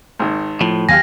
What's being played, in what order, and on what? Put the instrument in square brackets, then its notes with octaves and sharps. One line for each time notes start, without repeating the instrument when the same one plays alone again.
[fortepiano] G#1 D#3
[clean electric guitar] A2 [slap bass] F3
[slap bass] D#2 F#3 [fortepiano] G4 F5 G#5 [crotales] A#6